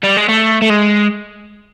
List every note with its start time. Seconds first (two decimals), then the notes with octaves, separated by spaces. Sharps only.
0.04 G3
0.17 G#3
0.29 A3
0.62 A3
0.70 G#3